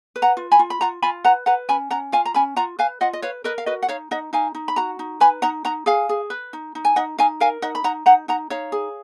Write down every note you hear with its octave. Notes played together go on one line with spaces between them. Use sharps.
B4
F#5 A#5
F4
G#5 B5
F4
B5
F4 F#5 A#5
F4 G#5 B5
B4 F#5 A#5
B4 F#5 A#5
C#4 G#5 B5
C#4 F#5 A#5
F4 F5 G#5
A#5
C#4 G#5 B5
F4 F#5 A#5
B4 F5 G#5
F4 D#5 F#5
D#5
B4 C#5 F5
A#4 B4 D#5
F5
F#4 B4 D#5
F#5
D#4 C#5 F5
D#4 D#5 F#5
D#4 F5 G#5
D#4
B5
F#4 F#5 A#5
D#4
B4 G#5 B5
D#4 F#5 A#5
D#4 F#5 A#5
G#4 F5 G#5
G#4
B4
D#4
D#4
G#5
D#4 D#5 F#5
D#4 F5 G#5
A#4 F5 G#5
D#4 D#5 F#5
B5
D#4 F#5 A#5
D#4 F#5 A#5
D#4 F#5 A#5
D#4 C#5 F5
G#4